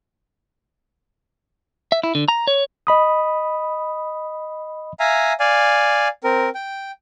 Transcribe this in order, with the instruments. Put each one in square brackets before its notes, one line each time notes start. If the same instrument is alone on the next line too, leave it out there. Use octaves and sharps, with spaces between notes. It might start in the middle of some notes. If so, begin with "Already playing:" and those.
[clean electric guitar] E5
E4
D3
A#5
C#5
[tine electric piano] D#5 B5 D#6
[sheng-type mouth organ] E5 F5 G#5 A#5
D5 F5 G#5
C4 A#4
G5